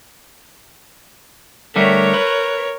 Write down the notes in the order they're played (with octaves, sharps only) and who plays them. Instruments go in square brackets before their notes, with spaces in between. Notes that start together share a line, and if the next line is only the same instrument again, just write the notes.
[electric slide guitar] D3 G3 A3 [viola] A#4 C#5
[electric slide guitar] B4